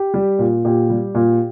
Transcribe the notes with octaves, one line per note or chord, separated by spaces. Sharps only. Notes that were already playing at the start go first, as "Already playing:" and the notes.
Already playing: G4
G3
A#2
A#2 G4
G3
A#2